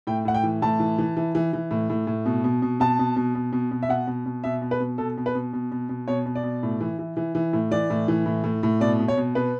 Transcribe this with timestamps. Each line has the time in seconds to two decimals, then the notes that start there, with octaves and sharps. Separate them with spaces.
0.07 A2 G5
0.25 A2 F#5
0.34 G5
0.43 E3
0.62 A2 A5
0.80 E3
0.98 E3
1.17 E3
1.35 E3
1.53 E3
1.71 A2
1.90 A2
2.07 A2
2.26 B2
2.44 B2
2.62 B2
2.80 B2 A5
2.99 B2
3.16 B2
3.35 B2
3.53 B2
3.71 B2
3.83 E5
3.89 B2 F#5
4.07 B2
4.26 B2
4.44 B2 E5
4.62 B2
4.71 B4
4.80 B2
4.98 B2 A4
5.17 B2
5.26 B4
5.35 B2
5.53 B2
5.72 B2
5.89 B2
6.08 B2 C#5
6.26 B2
6.35 D5
6.44 B2
6.63 A2
6.80 E3
6.99 E3
7.17 E3
7.35 E3
7.53 A2
7.71 E3 D5
7.90 A2
8.08 E3
8.26 A2
8.44 A2
8.63 A2
8.80 B2 D5
8.99 B2
9.08 C#5
9.17 B2
9.35 B2 B4